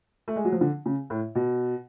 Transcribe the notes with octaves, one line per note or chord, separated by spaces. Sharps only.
A3
G#3
F#3
F3
D3
C#3
A2
B2